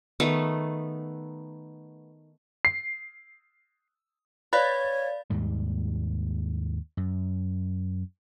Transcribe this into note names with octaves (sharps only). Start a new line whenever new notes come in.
D#3 A3 B3
C7
B4 C#5 D5 F5 A6
D#2 G#2 G3
F#2